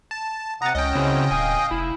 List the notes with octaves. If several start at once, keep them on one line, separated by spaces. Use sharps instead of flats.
A5
C3 F#5 A#5 D#6 A6
C#2 C#4 D#5 G5
C#3 C4 E4 F#4
D1 F5 G#5 D#6
F1 E4